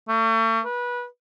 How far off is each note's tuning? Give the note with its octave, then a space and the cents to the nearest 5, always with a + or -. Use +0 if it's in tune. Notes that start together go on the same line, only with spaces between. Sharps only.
A3 +40
B4 -25